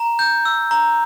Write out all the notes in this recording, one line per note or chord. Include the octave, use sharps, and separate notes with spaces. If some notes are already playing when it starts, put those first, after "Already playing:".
Already playing: A#5
G6
E6
A#5